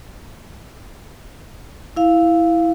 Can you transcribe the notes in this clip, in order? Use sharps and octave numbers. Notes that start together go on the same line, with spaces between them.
E4 F5